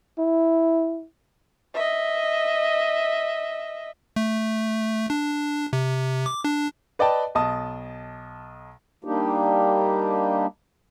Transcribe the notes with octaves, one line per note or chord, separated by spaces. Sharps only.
E4
D#5 E5
A3
D4
C3
D6
D4
B4 D5 D#5 G5 A5
B1 D#5 A5 D#6
G3 A#3 D4 D#4 G4